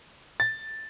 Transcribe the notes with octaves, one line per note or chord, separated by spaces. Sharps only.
A6